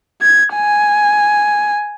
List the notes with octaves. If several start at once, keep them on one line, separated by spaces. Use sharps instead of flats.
G#6
G#5